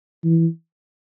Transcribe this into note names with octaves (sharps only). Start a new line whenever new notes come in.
E3